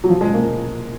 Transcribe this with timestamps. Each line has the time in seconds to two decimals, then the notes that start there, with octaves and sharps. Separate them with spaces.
0.04 F#3
0.09 F3
0.21 G#3
0.34 A#3